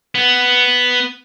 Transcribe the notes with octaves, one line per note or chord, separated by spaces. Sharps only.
B3